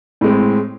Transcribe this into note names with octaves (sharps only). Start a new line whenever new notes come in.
A2 G#3 C4